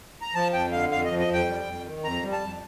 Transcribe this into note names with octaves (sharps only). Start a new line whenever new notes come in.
A#5
F3 A5
F2 G5
D3 F5
F2 F5
F3 D#5
D#5
F2 G5
G3
F2
D#3
F2 A#5
G3
A5
F2